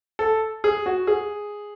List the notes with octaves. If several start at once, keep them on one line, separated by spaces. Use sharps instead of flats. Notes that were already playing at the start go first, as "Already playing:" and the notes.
A4
G#4
F#4
G#4